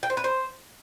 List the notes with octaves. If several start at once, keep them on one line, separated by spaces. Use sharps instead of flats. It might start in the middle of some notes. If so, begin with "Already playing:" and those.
G5
C5
B4
C5